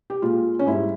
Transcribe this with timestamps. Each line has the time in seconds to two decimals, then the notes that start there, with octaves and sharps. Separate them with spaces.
0.10 G4
0.22 A#2 G#3 F4
0.59 C#4
0.66 G#2 G3 E4